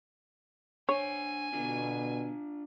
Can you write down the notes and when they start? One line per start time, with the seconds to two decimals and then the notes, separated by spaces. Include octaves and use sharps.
0.89 D4 C5 C#5 G#5
1.53 B2 D3 D4 F4